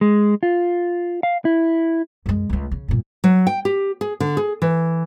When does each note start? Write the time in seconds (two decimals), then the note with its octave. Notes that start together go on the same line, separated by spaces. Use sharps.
0.01 G#3
0.43 F4
1.23 F5
1.45 E4
2.26 F#2 G#3
2.50 C#2 A3
2.71 C#3
2.88 G2 A#2
3.24 F#3
3.47 G5
3.65 G4
4.01 G#4
4.20 D3
4.37 G#4
4.62 E3